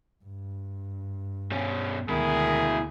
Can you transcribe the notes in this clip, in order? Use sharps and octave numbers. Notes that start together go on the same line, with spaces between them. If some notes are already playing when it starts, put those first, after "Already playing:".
G2
B2 C#4
D2 B2 D#3 E4 G#4